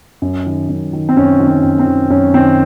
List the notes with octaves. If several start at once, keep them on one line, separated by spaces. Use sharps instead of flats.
F#2
D#3
F#2
D#3
C4
F#2 C#4
D#3
C#4
F#2
C4
D#3
F#2 C#4
D#3 C4